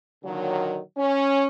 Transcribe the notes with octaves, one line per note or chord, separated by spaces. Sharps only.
A#2 D3 D#3 F#3
C#4